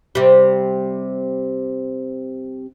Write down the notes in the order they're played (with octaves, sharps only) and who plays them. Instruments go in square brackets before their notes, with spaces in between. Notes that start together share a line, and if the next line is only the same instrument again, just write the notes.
[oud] C3 G3